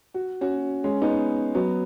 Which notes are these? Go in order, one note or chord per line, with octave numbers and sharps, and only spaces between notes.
F#4
C#4 F#4
G#3 C#4
B3 D#4
F#3 B3